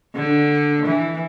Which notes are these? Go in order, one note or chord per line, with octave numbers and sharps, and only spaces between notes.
D3
E3